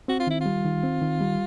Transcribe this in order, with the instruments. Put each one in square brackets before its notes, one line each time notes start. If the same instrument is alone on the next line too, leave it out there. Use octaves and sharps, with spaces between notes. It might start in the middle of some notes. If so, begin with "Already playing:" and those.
[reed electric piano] C4 [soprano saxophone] F#4
[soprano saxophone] F4
[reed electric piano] D#3 [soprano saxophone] E4
[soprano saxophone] F4
[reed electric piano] G3
D#3
C4
D#3
G3